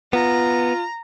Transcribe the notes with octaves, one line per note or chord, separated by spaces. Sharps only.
B3 F4 A#5